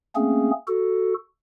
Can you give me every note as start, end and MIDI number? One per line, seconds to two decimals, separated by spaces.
0.16 0.51 57
0.16 0.51 58
0.16 0.51 60
0.16 0.51 61
0.16 0.51 68
0.68 1.14 66
0.68 1.14 69